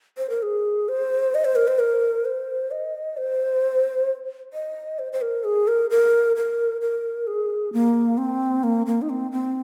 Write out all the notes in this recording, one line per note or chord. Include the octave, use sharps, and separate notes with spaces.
C5
A#4
G#4
C5
D#5
C5
A#4
C5
A#4
C5
D#5
C5
D#5
C5
C5
A#4
G#4
A#4
A#4
A#4
A#4
G#4
A#3
C4
A#3
A#3
D#4
C4
C4